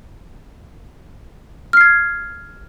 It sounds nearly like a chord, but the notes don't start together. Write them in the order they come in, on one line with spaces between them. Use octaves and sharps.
F6 C7 G#6